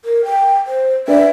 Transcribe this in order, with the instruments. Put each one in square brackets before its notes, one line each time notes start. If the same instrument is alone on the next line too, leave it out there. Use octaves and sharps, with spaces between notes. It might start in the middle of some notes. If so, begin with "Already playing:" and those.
[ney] A#4
G5
C5
[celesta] D4 B4 D5 [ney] E5